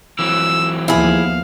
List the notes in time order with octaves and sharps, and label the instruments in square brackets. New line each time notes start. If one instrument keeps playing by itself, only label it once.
[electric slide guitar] E3 F#3 C4 [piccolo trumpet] E6
[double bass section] D#2 F3 B3 [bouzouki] E4 G#4 [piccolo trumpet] F5